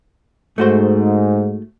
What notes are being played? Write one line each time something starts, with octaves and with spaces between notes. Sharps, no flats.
G#2 A3 F#4 C5